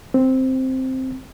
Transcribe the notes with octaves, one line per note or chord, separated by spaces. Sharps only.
C4